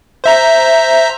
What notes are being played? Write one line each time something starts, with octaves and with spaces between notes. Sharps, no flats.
C5 E5 A#5